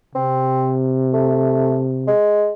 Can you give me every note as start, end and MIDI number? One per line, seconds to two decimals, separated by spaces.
0.15 2.11 48
0.15 0.76 60
1.13 1.82 57
2.08 2.52 56